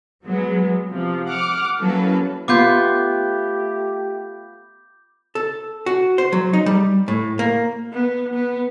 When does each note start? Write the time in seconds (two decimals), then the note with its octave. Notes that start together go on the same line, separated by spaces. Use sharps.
0.24 F#3 G#3 B3
0.88 C3 F3
1.26 F#5 D6 F6
1.79 F#3 A#3 C#4 E4 A4 B4
2.48 A3 B3 F4 G4 D6 G6
5.35 A4
5.86 F#4
6.18 C5
6.32 F#3
6.53 D#4
6.66 G3
7.08 A2
7.39 A#3
7.93 B3
8.34 B3